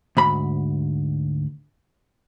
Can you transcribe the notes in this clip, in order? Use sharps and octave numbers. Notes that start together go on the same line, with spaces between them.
D2 G#2 B5